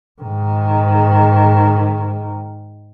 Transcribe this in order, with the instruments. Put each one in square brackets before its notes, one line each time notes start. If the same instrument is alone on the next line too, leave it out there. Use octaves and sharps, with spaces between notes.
[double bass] G#2 D#3